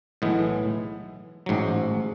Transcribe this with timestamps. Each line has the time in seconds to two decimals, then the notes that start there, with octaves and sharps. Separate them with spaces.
0.22 B1 A2 E3 G#3 B3
1.46 A1 G#2 F#3